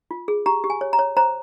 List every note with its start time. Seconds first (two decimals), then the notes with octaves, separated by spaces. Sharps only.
0.11 F4
0.28 G#4
0.46 G4 A#5
0.64 G4
0.70 G#5
0.81 C#5
0.93 A#5
0.99 C#5
1.17 C5 A#5